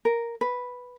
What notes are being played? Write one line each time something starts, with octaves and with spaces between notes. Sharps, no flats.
A#4
B4